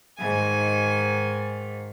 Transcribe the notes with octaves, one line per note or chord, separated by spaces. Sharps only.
G#2 D#3 G#5